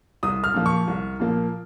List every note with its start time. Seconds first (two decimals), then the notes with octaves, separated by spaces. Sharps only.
0.23 C2 D#6
0.44 F6
0.54 A#2 F3 A#3
0.66 C#6
0.88 C2
1.20 A#2 F3 A#3